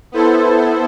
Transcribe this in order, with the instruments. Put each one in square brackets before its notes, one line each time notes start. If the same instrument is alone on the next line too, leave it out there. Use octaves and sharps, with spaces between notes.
[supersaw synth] B3 E4 A4 C5